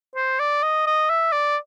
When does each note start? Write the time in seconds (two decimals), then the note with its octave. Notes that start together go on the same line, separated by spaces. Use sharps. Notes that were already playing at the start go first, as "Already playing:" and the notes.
0.16 C5
0.40 D5
0.63 D#5
0.87 D#5
1.10 E5
1.32 D5